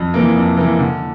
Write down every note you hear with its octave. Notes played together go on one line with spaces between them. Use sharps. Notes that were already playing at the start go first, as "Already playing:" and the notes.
Already playing: F2
E3 A#3
F2
E3 A#3
D3